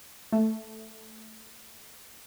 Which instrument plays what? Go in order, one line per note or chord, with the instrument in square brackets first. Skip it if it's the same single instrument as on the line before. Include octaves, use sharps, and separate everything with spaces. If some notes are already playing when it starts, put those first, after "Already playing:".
[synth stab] A3